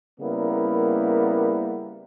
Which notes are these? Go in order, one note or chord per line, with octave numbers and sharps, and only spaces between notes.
C#3 G3 A#3 B3 E4 A#4